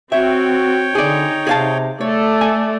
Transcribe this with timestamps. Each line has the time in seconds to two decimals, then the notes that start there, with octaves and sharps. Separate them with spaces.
0.12 C4 F#4 C#5 E5 G5
0.95 D3 D#4 G#4 D5
1.47 C3 G#4 F5 A5
2.01 A3 A4 C#5 D5
2.41 G#5